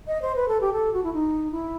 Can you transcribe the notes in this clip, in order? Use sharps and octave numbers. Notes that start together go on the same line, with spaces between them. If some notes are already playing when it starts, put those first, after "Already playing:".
D#5
C5
B4
A4
G4
A4
F#4
E4
D#4
E4